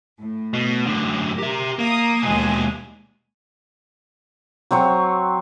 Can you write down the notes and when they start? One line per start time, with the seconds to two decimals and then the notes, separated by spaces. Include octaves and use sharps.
0.20 A2
0.53 B2
0.87 F#2 D3
1.38 G4 A#4 E5
1.79 A#3 A#5 D#6
2.22 D#2 B2 G#3 G#5
4.71 F#3 C4 C#5 C#6